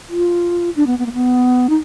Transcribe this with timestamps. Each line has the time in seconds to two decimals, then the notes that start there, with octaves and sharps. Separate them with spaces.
0.09 F4
0.76 D4
0.87 B3
0.99 B3
1.06 A#3
1.13 B3
1.69 D#4